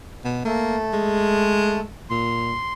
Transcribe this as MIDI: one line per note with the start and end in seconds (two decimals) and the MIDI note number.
0.24 0.41 47
0.45 1.80 57
0.45 0.78 58
0.93 1.86 56
2.10 2.56 46
2.10 2.73 84